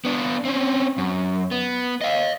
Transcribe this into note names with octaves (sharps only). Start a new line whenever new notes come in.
B3 D4
C4 C#4
F#2
B3
D#5 F5